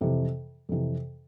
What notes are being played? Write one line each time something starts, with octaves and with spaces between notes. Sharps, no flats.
F2 C3 E3
F2 C3 E3